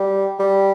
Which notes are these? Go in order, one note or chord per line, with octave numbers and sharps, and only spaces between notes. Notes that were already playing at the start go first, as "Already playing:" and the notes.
Already playing: G3
G3